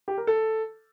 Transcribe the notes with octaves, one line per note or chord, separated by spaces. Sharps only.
G4
A#4
A4